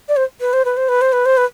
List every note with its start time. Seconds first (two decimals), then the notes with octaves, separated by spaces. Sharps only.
0.09 D5
0.16 C5
0.41 B4
0.53 C5
0.65 B4
0.77 C5
0.88 B4
1.01 C5
1.12 B4
1.25 C5
1.37 B4